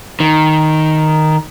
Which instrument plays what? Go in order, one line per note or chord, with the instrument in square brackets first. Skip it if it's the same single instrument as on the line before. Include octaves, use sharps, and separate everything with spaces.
[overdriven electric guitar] D#3